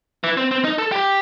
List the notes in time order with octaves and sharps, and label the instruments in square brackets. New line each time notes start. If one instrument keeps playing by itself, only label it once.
[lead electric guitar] E3
C4
C4
D#4
A4
G4